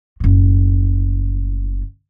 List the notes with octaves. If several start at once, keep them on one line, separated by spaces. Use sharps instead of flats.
F#1 A2